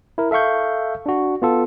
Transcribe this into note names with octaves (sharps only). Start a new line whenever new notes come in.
E4 A#4
A4 E5 F5 C#6 G6
D4 F#4
B3 F4 A4